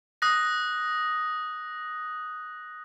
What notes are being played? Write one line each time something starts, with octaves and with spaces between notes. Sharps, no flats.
D#6 F#6 A#6